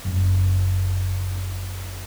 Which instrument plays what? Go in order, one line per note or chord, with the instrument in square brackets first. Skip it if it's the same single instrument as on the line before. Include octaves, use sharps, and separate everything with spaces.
[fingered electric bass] F#1 F#2